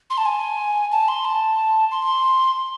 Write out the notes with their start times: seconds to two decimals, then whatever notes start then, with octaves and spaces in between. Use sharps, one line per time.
0.10 C6
0.18 A5
0.25 G#5
0.92 A5
1.08 C6
1.25 A5
1.91 C6